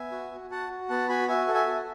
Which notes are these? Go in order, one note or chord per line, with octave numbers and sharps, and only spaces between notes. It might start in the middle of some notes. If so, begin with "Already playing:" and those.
Already playing: B3 E5 G#5
F#4
F#4
F#4 F#5 A5
F#4
B3 F#5 A5
F#4 G#5 B5
F#4 E5 G#5
A4
E5 G#5
F#4